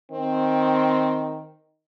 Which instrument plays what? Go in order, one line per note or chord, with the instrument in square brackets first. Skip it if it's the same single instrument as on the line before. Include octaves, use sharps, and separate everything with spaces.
[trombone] D#3 [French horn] C4